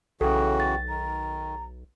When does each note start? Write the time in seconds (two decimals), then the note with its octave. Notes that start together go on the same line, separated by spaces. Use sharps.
0.21 B1 C#3 E3 F#4 A4 G5
0.60 A6
0.89 D#3 A#5